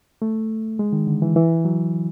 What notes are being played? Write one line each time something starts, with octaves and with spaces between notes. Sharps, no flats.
A3
G#3
D#3
D3
E3
E3
F#3